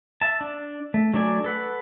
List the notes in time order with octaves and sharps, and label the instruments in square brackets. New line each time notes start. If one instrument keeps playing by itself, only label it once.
[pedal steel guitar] E5 A5
D4
A3
F#3 A3 D4 D5 G#5
A4 B4 F#5